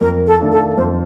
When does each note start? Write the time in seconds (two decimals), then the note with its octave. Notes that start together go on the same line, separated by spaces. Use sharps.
0.01 F2 A#4
0.27 A4
0.39 D#3 A3 D4 F4
0.52 A4
0.77 F2 C5